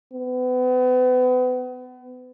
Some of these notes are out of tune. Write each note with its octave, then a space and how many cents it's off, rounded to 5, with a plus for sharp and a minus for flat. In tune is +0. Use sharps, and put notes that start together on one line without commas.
B3 +35